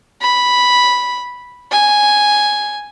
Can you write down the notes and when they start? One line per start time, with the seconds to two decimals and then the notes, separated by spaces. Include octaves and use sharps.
0.22 B5
1.72 G#5